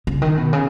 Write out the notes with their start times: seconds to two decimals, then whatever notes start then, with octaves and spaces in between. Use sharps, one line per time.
0.07 C#3
0.22 D#3
0.37 B2
0.53 C#3